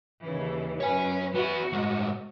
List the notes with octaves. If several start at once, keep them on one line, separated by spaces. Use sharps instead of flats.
D#2 C#3 E3
F#2 B4 C#5 G#5
B3 E4 F#4
A2 G#3